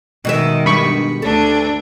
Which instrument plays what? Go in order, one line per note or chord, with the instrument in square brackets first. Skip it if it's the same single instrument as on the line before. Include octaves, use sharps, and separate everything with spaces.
[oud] B2 G#3 E5 [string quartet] D#3
[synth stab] G2 B5 C#6
[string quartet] D2 D4 [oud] A4